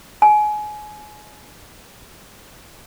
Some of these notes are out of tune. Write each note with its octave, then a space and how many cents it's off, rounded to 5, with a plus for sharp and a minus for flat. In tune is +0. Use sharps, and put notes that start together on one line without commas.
G#5 +25